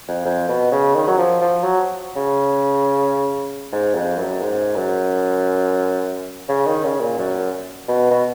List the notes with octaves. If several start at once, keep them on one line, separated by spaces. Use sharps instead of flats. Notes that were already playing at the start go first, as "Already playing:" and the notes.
F2
F2
B2
C#3
D#3
F#3
F3
F3
F#3
C#3
G#2
F2
F#2
G#2
F#2
C#3
D#3
C#3
A#2
F#2
B2
B2